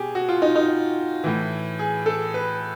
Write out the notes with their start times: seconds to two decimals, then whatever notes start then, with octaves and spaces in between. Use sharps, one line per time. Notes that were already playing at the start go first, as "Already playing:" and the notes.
Already playing: B2 G4 G#4
0.15 F#4
0.29 F4
0.42 D#4
0.55 D#4
1.24 A2 E3
1.79 G#4
2.06 A4
2.34 B4